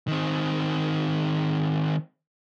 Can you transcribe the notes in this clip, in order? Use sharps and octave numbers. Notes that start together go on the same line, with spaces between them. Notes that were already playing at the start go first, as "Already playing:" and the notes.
D#3 C4